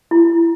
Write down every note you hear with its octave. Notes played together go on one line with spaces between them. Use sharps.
E4